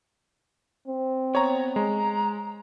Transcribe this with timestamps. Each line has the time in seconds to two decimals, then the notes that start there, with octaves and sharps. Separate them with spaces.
0.88 C4
1.35 B3 C#5 A#5
1.76 G#3 A#5